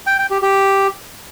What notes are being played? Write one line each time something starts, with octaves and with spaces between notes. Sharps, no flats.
G5
G5
G4
G4